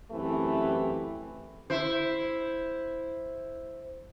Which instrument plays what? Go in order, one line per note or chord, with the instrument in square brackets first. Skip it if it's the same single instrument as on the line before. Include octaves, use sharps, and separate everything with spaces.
[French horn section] F#2 E3 A3 C4 E4 G4
[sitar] E4 C5